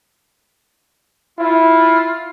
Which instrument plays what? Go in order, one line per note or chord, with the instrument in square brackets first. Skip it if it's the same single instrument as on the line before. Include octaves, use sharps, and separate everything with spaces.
[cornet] E4 [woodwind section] F4